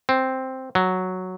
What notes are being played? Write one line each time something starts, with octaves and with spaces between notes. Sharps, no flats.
C4
F#3